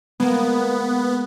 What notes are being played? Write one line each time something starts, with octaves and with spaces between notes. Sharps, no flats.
G#3 A#3 B3